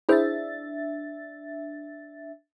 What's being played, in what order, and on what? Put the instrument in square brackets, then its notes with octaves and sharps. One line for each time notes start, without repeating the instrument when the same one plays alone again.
[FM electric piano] D4 E5 A6 [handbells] E4 G#4 C5